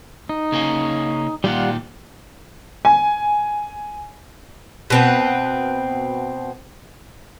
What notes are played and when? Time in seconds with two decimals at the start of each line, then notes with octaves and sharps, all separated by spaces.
0.29 D#4
0.52 C#3 A#3 C#4
1.44 A#2 D#3 G3 F4 G4 F#5
2.85 G#5
4.90 B2 C4 B4